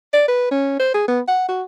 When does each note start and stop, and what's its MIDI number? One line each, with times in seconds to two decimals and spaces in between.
0.14 0.25 74
0.28 0.47 71
0.51 0.75 61
0.80 0.92 72
0.94 1.07 68
1.08 1.20 59
1.28 1.48 78
1.49 1.63 66